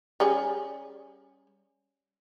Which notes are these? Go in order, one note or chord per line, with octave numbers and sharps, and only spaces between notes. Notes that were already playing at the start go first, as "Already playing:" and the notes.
G3 C#4 G#4